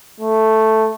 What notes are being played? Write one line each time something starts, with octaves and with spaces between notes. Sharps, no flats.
A3